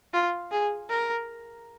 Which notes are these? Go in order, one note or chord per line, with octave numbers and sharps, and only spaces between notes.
F4
G#4
A#4